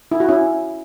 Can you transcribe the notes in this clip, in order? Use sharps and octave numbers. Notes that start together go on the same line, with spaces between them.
E4
F#4
C#4 E4